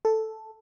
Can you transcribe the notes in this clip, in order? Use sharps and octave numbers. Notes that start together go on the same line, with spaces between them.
A4